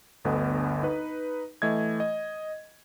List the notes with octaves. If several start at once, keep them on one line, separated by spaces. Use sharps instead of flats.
G1 D2 D3 B3 D#5
D#4 B4
E3 A3 D#5 G#6
D#5